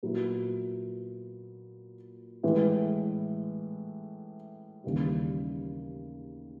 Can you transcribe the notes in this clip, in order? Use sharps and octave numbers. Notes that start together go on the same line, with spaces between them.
A#2 F#3 B3 E4
A2 E3 G#3
D#2 C#3 E3 G3